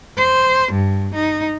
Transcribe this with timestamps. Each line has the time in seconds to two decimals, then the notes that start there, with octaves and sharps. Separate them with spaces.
0.17 C5
0.72 G2
1.15 D#4